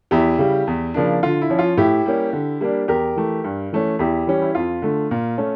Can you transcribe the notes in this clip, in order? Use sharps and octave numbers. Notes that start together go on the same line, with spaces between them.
E2 E4 G4
C#3 G3
E2
C#3 F3 A#3 D4
D3 F4
E4
F3 C#4
F4
A2 E4 G4
G3 A#3 C#4
D3
G3 A#3 D4
E2 G4 A#4
E3 A3
G2
E3 A3 C#4
E2 E4 G4
E3 G3 C#4
E4
F2 F4
D3 A3
A#2
A3 C#4